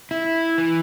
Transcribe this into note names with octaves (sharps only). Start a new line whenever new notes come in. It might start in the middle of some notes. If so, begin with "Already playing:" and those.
E4
E3